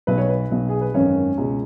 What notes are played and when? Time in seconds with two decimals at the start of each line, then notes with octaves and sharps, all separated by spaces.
0.07 B1 B2 B4
0.18 C#5
0.29 B4
0.51 B1 B2
0.69 G#4
0.81 B4
0.94 G#1 F#2 D#3 C#4 C#5
1.38 C#2 B2